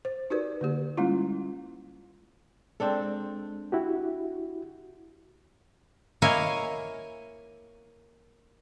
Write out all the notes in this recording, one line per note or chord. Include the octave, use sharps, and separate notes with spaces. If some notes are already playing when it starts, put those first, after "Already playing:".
C5
D#4 F#4 G4 A#4 B4 D5
D3 A#3 G4
G3 G#3 A#3 C#4 E4 F4
G#3 C4 D4 A4
E4 F#4 G4
A#3 E4 C#5 D#5 F5 G#5